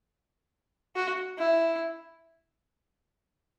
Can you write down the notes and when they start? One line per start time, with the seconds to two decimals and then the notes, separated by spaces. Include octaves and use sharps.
0.96 F#4
1.39 E4